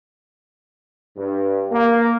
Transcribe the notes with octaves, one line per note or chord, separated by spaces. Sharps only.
G2
A#3